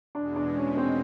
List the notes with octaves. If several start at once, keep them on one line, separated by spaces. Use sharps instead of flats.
E2 B2 G#3 D4
D4
C#4
C4